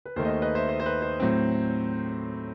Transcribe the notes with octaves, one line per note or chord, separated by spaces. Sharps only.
B4
D#2 D#3 A3 C5
D#5
C5
B4 D#5
C5 E5
C5
C5
B4
C5
A2 F#3 C4